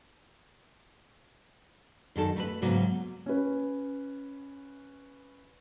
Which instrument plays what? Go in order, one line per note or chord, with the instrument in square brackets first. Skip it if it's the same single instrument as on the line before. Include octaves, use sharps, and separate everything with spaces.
[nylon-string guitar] F#2 D#3 A4
A3 A#4 B4
G#2 C#3 F#3 A#3 B3
[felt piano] C#4 B4